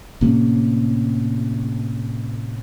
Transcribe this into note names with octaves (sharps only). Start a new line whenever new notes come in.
A2 C3 A#3 C#4